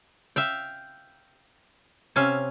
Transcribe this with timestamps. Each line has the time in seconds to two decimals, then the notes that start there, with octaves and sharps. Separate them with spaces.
0.36 E5 F5 G5
2.16 C3 C#4 E5 F5